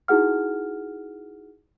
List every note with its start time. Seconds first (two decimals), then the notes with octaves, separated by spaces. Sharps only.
0.08 D#4 E4 F#4 G#4 F#5 F6